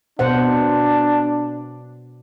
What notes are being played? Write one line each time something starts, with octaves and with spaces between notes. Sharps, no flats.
B2 D4 C5 F#5